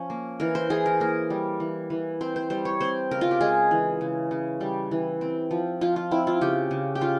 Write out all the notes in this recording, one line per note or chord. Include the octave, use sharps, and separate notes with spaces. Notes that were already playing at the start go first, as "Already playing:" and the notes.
Already playing: F3 C#4
A#3
E3 A#4
C5
E3 G#4
A#4
A#3 A#4
G3
E3
E3
C4 C5
C5
G3 C5
C#5
C4 C5
C#3 A#4
F4
G4
G#3 G#4
E3
C#3
C#3
G3
E3
C4
F3
F3 F4
F4
C4 E4
F4
C#3 G4
C#3
G4
C#4 F4